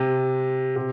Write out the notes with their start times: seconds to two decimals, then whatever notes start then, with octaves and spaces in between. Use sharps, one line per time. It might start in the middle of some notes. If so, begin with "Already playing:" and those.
Already playing: C3
0.76 C3